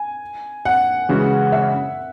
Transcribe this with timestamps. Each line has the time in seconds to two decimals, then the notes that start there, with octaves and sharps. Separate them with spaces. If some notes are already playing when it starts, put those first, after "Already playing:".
Already playing: G#5
0.65 F#5
1.09 C#3 E3 G#3 C#4 F#4
1.52 E5